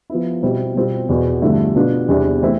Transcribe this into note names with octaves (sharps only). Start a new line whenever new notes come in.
F3 B3 E4
B2 G3 C4 E4
B2 G3 C4 F4
E2 B2 B3
G2 D3 F3 A3 E4
B2 B3 D4 F4
E2 C3 G3 D4
E3 A3 C4 E4